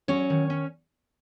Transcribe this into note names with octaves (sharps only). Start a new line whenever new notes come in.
F#3 C#4 C#5
D#3
C#4